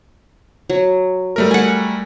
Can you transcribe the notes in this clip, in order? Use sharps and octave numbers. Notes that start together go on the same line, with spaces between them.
F#3
G3 A3 A#4
F#5 G#5